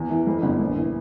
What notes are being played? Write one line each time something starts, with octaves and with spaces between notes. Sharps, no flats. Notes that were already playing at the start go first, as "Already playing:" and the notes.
Already playing: E2
E3
F2
G1
A#1
E3